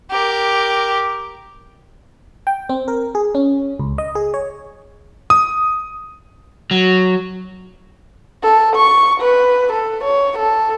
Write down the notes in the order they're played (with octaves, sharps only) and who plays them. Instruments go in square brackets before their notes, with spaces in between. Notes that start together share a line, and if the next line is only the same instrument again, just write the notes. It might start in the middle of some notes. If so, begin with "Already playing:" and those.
[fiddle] G4 A#4
[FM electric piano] G5
C4
A#4
G#4
C#4
C#2
D#5
G#4
C#5
[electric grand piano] D#6
[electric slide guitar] F#3
[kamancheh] A4
C#6
B4
A4
C#5
A4